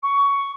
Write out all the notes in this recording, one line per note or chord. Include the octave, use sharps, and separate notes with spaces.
C#6